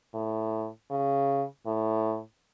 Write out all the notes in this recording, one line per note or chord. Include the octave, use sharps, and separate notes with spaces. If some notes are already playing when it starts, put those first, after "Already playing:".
A2
C#3
A2